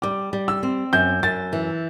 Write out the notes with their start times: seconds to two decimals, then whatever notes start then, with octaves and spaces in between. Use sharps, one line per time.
0.02 G3 D6
0.33 G3
0.48 E6
0.63 C4
0.93 F#2 G6
1.23 F#2 A6
1.53 E3